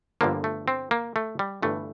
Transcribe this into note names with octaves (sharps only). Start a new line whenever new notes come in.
G1 G2 D3 F3 A#3
A3
C4
A#3
A3
G3
G1 G2 E3 A3